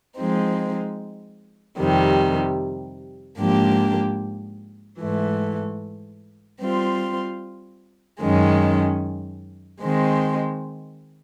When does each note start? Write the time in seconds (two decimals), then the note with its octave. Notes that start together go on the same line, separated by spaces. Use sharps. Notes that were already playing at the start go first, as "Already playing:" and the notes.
0.18 F3 G#3 C4 D#4
1.79 F2 C3 D#3 G3
3.39 G#2 F3 A#3 D4 G4
5.00 G#2 E3 A3
6.61 G3 C4 F4
8.21 F#2 D#3 G#3 C#4
9.82 D#3 G#3 C4